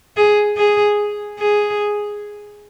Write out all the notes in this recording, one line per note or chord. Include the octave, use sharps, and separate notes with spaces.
G#4
G#4
G#4